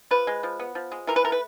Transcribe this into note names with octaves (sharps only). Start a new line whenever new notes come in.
F3 B4
G#3
F3
B3
F3
G#3
E3 A#4
B4
A3 A#4
B4